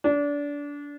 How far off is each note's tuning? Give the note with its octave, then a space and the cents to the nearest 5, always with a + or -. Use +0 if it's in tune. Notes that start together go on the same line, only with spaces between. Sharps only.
D4 -25